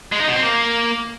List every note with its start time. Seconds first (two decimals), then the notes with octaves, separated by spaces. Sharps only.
0.12 G#3
0.20 D#4
0.27 B2
0.35 C4
0.43 A#3